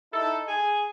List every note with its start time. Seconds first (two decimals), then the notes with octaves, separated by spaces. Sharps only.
0.13 D#4 E4 A4
0.47 G#4 G#5